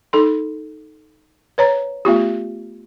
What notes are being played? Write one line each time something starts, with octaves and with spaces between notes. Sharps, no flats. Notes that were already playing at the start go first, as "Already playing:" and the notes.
D#4 A4 C6
B4 C#5 A#5
A3 B3 F4 G4